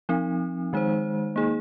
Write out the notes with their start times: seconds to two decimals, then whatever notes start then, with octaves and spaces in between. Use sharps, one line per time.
0.09 F3 C4 D#4
0.73 D#3 G#3 D#4 C5
1.36 A#3 D#4 G#4